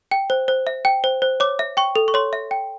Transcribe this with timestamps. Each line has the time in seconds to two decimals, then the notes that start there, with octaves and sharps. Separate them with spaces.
0.11 G5
0.30 C5
0.48 C5
0.67 E5
0.85 G5
1.04 C5
1.22 C5
1.40 C#5 D6
1.59 E5
1.77 G5 C#6
1.96 A4
2.08 C#6
2.14 C#5 C6
2.33 E5
2.51 G5